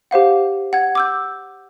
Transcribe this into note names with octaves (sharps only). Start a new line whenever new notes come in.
G4 C5 F5 F#5
F#5 G#6
D6 E6 G6